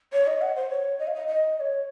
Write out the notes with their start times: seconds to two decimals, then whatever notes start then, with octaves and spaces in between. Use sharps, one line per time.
0.13 C#5
0.27 D#5
0.41 F#5
0.56 C5
0.70 C#5
0.99 D#5
1.07 F5
1.15 D#5
1.27 D#5
1.56 D#5
1.60 C#5